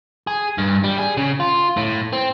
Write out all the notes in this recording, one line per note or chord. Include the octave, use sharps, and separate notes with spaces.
G#4
G2
G3
G#4
C#3
F4
A2
C4